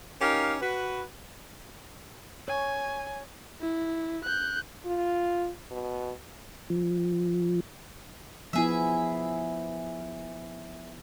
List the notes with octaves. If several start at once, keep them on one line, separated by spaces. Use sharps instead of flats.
C#4 D#4 G4 A#4 F5
F#4 B4
C#5 G#5
E4
F#6 G6
F4
B2
F3
F3 B3 E4 G#4 E5